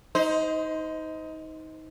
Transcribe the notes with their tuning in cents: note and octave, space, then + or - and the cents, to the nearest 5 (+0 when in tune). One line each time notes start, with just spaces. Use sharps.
D#4 +20 C5 -25